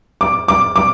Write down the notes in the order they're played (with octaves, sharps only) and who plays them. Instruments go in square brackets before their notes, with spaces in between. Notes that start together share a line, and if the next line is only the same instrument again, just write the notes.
[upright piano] D6
D6
D6